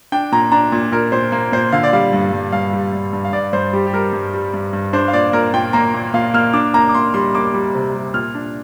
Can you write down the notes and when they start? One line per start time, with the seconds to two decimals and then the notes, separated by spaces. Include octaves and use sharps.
0.12 D4 G5
0.32 A#2 A#5
0.52 D4 A#5
0.72 A#2
0.92 A#2 A#4
1.12 A#2 C5
1.32 A#3
1.52 A#2 C5
1.73 D3 F5
1.83 D5
1.93 G3 F5
2.13 G2
2.33 G2
2.52 G2 F5
2.73 G3
2.93 G2
3.13 G2
3.25 F5
3.33 G2 D5
3.53 G2 C5
3.73 G3 G4
3.87 G4
3.93 G3 A#4
4.13 G2
4.34 G3
4.54 G2
4.73 G2
4.93 D4 C5
5.08 F5
5.13 A#2 D5
5.33 A#2 A#4
5.54 A#2 G5
5.73 A#3 A#5
5.94 A#2
6.14 A#2 F5
6.34 A#3 F6
6.53 D4 D6
6.74 A#3 A#5
6.89 D6
6.94 A#3 C6
7.14 G3 C6
7.34 A#3 D6
7.54 G3
7.75 C3
7.94 G3
8.14 A#2 F6
8.35 D4